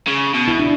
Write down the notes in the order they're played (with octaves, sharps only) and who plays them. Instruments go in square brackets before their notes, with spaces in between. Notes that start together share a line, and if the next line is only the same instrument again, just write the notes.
[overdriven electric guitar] C#3
B2
[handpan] E4
D4